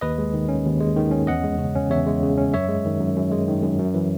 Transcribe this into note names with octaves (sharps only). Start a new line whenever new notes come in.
D#2 B4 D#5
G#3
D#3
C#4
D#2
G#3
D#3
C#4
E2 D#5 F#5
G#3
C#3
C#4
E2 C#5 E5
G#3
C#3
C#4
F#2 C#5 E5
G#3
D#3
F#2
F#2
G#3
D#3
F#2
F#2
E3